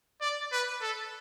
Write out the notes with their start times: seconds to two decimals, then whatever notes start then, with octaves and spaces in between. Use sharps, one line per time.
0.21 D5
0.52 B4
0.82 A4